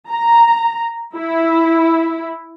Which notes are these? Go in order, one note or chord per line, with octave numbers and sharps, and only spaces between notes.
A#5
E4